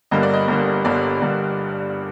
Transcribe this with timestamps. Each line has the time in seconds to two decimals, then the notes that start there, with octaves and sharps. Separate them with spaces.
0.11 G1 G2 D3 G3 A#3 D#5
0.23 D5
0.33 D#5
0.48 G1 G2 D3 G3 A#3
0.85 G1 G2 D3 G3 A#3 D5
1.21 G1 G2 D3 G3 A#3